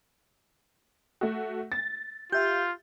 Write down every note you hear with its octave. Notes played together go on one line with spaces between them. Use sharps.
A3 F#4
A6
F4 G4 E5 F5 G6